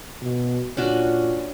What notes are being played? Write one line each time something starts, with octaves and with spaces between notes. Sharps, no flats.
B2
A#2 C#4 D4 F#4